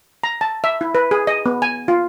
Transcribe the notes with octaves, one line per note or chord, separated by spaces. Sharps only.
A#5
A5
E5
E4
B4
G#4
D#5
B3
G#5
F4